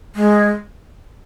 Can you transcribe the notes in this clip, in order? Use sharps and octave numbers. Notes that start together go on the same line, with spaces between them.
G#3